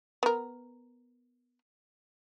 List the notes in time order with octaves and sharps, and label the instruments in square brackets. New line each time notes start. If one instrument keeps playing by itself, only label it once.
[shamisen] B3 A#4